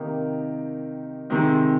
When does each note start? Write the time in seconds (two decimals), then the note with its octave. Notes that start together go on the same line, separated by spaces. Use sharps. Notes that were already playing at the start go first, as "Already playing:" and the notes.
Already playing: C3 D#3 A#3 D#4 G4
1.30 C3 D#3 G#3 C4